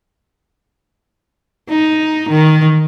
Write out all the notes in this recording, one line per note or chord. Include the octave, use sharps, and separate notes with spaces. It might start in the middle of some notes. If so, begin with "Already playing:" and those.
D#4
D#3